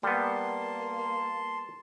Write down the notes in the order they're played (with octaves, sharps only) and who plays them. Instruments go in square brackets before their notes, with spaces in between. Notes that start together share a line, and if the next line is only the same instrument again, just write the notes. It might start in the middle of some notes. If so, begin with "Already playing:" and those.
[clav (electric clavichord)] G3 B3 [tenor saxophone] A#3 [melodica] A5 C6